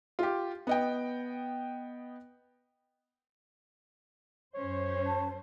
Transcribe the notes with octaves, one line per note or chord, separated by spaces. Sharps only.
F4 G4
B3 D#5 G5
F#2 C#4 C5 C#5
A5